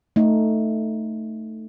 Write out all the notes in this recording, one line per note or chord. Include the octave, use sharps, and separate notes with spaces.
A3 D#4